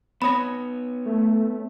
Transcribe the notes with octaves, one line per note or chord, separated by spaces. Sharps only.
B3 C#5 B5 D#6 A#6
A3